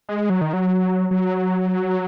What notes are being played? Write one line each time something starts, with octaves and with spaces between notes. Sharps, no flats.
G#3
F#3
D#3
F#3
F#3